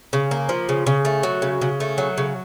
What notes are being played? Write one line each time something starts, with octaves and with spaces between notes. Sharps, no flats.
C#3
A#3
F3
C#3
C#3
A3
F#3
C#3
C#3
A3
F#3
C#3